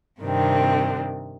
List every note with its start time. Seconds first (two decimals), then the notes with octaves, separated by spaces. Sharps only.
0.21 G2 C3 D#3 C4 D4